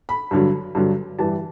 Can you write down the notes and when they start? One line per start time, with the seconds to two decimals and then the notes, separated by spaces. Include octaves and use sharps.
0.09 B5
0.31 G2 D3 F#3
0.75 G2 D3 F#3
1.19 G2 E3 G3 A5